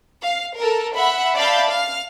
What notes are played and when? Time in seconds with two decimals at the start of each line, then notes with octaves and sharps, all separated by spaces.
0.22 F5
0.57 A4 A#4
0.94 E5 F#5 B5
1.36 D5 E5 F5 A5 B5 G6
1.70 F5 F6